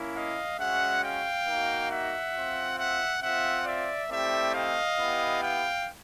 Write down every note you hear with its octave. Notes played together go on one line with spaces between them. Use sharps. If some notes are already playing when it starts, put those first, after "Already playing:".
Already playing: A#3 C#4 E4
D#5 F5
G#3 C#4 F#4 E5 F#5
F5 G5
A#3 D#4 F#4
E5 F#5
C4 F4
E5 F#5
C4 F4 E5 F#5
D5 E5
A3 C4 E4 G4 D5 E5
D#5 F5
B3 E4 G4
F5 G5